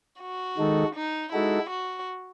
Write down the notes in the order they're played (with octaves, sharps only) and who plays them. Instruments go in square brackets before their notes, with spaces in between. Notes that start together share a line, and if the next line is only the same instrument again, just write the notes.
[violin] F#4
[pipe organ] D#3 G#3 D#4 A4
[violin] D#4
[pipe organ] G#3 D#4 F#4 A4 [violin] E4
[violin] F#4